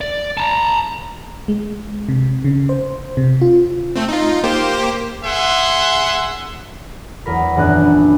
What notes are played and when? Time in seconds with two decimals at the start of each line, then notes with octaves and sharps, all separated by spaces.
0.01 D5
0.37 A5 A#5
1.48 G#3
2.09 C3
2.44 C#3
2.69 C5
3.17 C3
3.42 F4
3.96 A3 C4
4.08 D#4 F4
4.44 A#3 G4 C5
5.24 G#4 E5 F#5 C6
7.26 E2 F#3 A#4 B5
7.56 D#1 F#2 B3 D4 D5 F#6